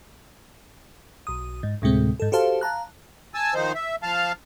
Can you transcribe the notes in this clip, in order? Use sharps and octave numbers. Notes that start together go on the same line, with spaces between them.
B1 D#6
G#2
D2 A2 C3 G#3 C4
G#2 A4
F#4 G4 A4 C5 F5 A5
F5 A5 A#5 F#6
G#5 A5 E6
D#3 F3 D#4 C5
E5
F3 F5 A5 F6